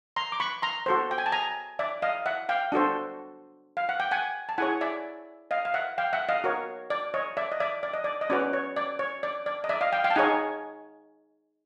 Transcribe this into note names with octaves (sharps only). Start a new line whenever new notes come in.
A#5 C6
D6
B5 C#6
A#5 C6
F#4 A4 C5
G5
G#5
A5
G#5 A#5
D5 E5
D#5 F5
E5 F#5
F5 G5
D4 F#4 A4 C5
F5
F#5
G5
F#5 G#5
A5
E4 G#4 C#5 F#5 G#5
D5 E5
D#5 F5
F5
E5 F#5
F5 G5
E5 F#5
D#5 F5
F#4 A#4 C#5
D5
C#5 D#5
D5 E5
D#5
D5 E5
D5
D#5
D5
D#5
C#4 F#4 B4 D5
C#5
D5
C#5
D5
D5
D#5
D5 E5
D#5 F5
F5 G5
F5 G5
A5
D#4 G#4 C#5 F#5 G#5